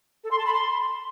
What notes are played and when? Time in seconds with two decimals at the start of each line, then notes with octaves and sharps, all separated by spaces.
0.24 A4
0.31 C6
0.39 A5
0.46 B5
0.53 C6